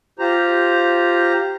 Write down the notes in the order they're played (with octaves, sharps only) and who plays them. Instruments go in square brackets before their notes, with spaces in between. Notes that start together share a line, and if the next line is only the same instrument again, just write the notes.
[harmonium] F4 G4 C5 A#5